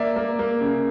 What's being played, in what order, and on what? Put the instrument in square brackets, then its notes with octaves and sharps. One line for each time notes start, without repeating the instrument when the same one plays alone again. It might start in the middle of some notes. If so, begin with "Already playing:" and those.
Already playing: [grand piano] A#3 D5 E5
A#3
A#3
C#3